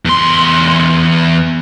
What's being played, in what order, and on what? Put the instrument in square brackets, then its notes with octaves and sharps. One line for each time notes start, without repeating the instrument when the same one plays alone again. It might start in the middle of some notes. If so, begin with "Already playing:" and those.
[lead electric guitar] E2 C6